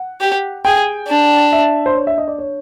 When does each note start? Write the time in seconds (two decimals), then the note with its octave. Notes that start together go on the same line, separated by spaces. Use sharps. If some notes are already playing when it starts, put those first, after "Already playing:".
Already playing: F#5
0.21 G4
0.65 G#4 G5
1.08 D4
1.53 E5
1.86 C5
1.95 C#5
2.07 E5
2.18 D#5
2.28 D5
2.39 C#5